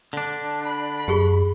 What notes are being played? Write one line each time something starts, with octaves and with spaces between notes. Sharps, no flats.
D3 D4
B5
F#2 G4 G#4 C#6